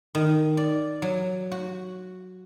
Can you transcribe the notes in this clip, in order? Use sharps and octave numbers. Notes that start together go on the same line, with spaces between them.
D#3
D5
F#3
F#4